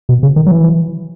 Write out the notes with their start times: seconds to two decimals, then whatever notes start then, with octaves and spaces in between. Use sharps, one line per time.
0.09 B2
0.23 C#3
0.36 D#3
0.46 F#3
0.51 E3